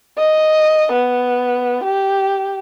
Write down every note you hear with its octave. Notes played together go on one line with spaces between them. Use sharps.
D#5
B3
G4